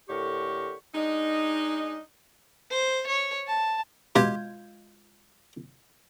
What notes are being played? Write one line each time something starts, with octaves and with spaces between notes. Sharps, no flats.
A2 D3 G4 A#4 C#6
G#3 D4 D#4
C5
C#5
A5
B2 G#3 F4 G4 G6 G#6